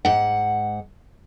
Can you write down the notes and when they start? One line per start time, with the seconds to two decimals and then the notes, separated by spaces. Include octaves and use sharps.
0.05 G#2 F#5